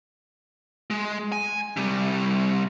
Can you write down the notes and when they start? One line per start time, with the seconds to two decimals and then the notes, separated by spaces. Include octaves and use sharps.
0.90 G#3
1.32 G#5
1.77 C3 G3